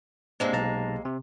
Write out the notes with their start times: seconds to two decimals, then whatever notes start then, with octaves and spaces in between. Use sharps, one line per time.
0.40 C3 G#3 A#3 C4 D4
0.53 B1 A5 A#5
1.05 C3